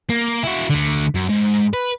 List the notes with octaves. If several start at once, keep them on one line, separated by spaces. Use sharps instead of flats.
A#3
E4 F#4
D3 A3
F#2
G#2
B4